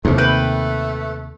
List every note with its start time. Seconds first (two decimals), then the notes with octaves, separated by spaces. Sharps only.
0.05 D#2 C3 A3
0.18 B4 G5